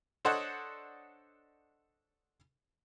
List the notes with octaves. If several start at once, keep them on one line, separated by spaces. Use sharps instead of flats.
D4 A4 C5 C#5 D#5 F#5